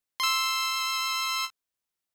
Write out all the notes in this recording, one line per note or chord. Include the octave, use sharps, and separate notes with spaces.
C6 E6